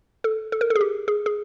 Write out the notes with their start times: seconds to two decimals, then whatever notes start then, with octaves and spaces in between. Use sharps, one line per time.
0.24 A4
0.52 A4
0.61 A#4
0.70 A4
0.76 G#4
0.81 G4
1.08 G#4
1.26 G#4